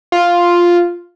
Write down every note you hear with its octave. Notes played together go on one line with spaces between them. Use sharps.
F4